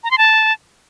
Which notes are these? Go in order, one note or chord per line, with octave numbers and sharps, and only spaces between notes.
A#5
C6
A5